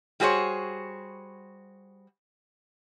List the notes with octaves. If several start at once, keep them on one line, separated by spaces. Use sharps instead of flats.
G3 F#4 G#4 C5 C#5